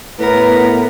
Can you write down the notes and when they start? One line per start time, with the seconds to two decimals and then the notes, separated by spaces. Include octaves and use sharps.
0.19 A2 B3 A#4 B4